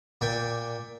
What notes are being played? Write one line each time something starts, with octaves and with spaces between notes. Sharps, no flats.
A#2 D5 G5 G#5